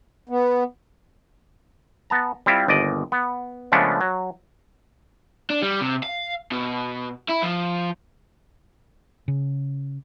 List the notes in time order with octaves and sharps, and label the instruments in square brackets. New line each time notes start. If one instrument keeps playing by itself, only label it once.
[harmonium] B3
[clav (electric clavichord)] B3 A5 A#5
G3 C4 E4 F4
G1 D#2 D5 D#5
B3
C#3 F3 G#3 A3 B3 D4
F#3
[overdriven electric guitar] D4
G3
C3
F5
B2
E4
F3
[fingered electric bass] C#3